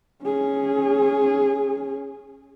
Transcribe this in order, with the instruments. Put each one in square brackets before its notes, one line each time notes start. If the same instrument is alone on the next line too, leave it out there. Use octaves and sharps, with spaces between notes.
[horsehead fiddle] C#4 G#4